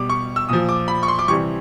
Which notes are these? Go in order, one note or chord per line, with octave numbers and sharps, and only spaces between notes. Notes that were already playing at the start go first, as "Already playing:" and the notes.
Already playing: B2 G3 D6
C#6
E6
A#2 F3 D#6
D6
B5
C#6
C6
D6
C3 E3 G3 C#6